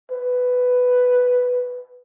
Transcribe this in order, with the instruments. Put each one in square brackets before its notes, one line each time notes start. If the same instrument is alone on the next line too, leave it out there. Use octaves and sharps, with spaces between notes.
[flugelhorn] B4